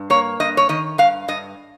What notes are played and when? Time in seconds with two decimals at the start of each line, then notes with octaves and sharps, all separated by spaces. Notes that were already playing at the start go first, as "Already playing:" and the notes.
Already playing: G2
0.10 A#3 C#5
0.40 G2 D#5
0.57 C#5
0.69 D#3 D#5
0.98 G2 F5
1.28 G2 D#5